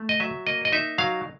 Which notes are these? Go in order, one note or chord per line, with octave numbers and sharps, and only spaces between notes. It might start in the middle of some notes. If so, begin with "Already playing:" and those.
Already playing: A3
D#5
F#3 E5
A#3 D#5
D#5
D#4 E5
F#3 F5